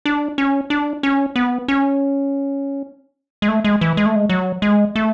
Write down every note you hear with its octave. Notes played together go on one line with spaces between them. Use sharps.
D4
C#4
D4
C#4
B3
C#4
G#3
A3
G#3
E3
G#3
A3
G#3
F#3
G#3
A3